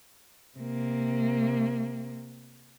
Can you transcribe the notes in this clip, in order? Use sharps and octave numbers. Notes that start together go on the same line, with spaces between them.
C3 A#3